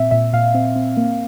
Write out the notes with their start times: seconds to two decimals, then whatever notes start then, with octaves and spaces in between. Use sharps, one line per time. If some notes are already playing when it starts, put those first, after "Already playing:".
Already playing: A#2 C4 E5
0.11 A#2 E5
0.33 A#2 F5
0.54 C4
0.76 C4
0.97 A#3